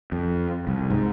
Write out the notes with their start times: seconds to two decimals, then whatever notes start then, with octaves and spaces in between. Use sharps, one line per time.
0.12 F2
0.67 C2
0.90 G#2